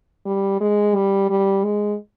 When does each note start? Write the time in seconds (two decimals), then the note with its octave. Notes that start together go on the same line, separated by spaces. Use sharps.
0.26 G3
0.61 G#3
0.95 G3
1.30 G3
1.64 G#3